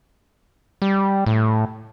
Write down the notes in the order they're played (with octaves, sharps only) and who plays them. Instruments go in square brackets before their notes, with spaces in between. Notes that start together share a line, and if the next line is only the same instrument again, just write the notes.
[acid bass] G3
A2